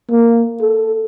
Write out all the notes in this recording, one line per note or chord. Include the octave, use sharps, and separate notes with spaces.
A#3
A4